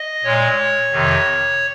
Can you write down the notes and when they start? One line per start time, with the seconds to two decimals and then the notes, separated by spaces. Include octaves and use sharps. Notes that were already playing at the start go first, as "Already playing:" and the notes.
Already playing: D#5
0.24 A#2 G#3 C#5
0.91 F2 C3 D#3